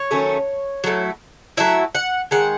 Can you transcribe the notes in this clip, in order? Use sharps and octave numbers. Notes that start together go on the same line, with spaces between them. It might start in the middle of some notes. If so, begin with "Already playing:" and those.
Already playing: C#5
D#3 F#3 A3 C#4
F#3 A3 E4
F#3 A3 E4 E5
F#5
D#3 G#3 F#5